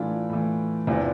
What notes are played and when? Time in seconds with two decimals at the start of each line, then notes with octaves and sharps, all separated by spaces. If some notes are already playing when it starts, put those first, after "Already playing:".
Already playing: A2 E3 D4 F4
0.30 A2 E3
0.87 E2 C3 E3 D4 F4